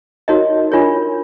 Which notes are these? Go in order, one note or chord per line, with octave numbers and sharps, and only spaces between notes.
D#4 F#4 A#4 C#5 D#5
D4 F4 A#4 C#5